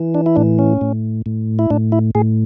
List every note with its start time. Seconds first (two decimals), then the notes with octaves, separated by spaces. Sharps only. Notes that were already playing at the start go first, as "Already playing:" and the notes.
Already playing: E3
0.15 D4
0.26 E4
0.36 A2 D4
0.59 C#4
0.81 A2
1.26 A2
1.59 E4
1.70 A2 D4
1.92 E4
2.15 A2 G#4